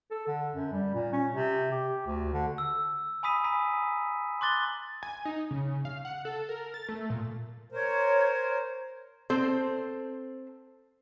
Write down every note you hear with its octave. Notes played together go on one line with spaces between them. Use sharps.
A4
D3
F#2
G3
A#2
C#4
C3
G4
D2
D3
E6
G#5 B5 D#6 B6 D#7
G#5 A#5 B5 B6
C6 D6 F#6 A6 G7
G#5
D#4
C#3
F5
F#5
A4
A#4
A6
A3
A#2
A#4 C5 C#5
C4 A4 C5